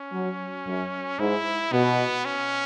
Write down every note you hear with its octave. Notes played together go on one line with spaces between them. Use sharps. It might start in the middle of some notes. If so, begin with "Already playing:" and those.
Already playing: C#4
F#3
F#2
G#2 E4
B2 B3
C#4